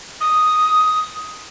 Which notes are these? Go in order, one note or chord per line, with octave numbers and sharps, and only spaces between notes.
D#6